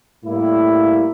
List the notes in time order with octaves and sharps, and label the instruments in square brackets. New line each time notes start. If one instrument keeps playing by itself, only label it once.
[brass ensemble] A2 G3 A#3 E4